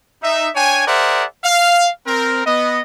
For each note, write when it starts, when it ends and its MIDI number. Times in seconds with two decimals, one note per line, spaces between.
0.23 0.49 63
0.23 0.49 76
0.55 0.84 62
0.55 0.84 73
0.55 0.84 79
0.55 0.84 80
0.87 1.25 68
0.87 1.25 70
0.87 1.25 72
0.87 1.25 74
0.87 1.25 76
0.87 1.25 78
1.44 1.89 77
2.07 2.44 60
2.07 2.44 70
2.45 2.81 59
2.45 2.81 75